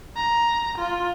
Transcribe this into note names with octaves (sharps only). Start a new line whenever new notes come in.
A#5
F4